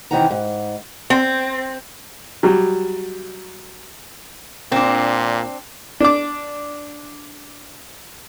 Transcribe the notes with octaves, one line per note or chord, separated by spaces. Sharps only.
C3 D#3 E3 D#4 F#5 A#5
G#2
C4
F#3 G3
A#2 C4 D4
D4 D6